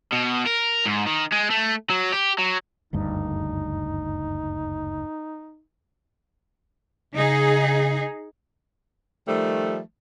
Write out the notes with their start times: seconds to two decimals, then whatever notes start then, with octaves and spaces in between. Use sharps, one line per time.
0.13 B2
0.46 A#4
0.86 G#2
1.06 D#3
1.32 G#3
1.51 A3
1.90 F#3
2.13 G4
2.39 F#3
2.93 F#1 D2 G2 D#4
7.14 C#3 D#4 G#4
9.27 D#3 F3 G3 A3